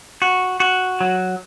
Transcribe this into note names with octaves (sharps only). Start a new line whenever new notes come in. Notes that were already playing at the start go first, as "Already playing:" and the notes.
F#4
F#4
F#3